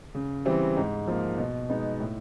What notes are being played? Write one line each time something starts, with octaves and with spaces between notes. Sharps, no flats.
C#3
E3 G3 C4
G#2
F3 A#3
B2
G#3 B3 D#4
A2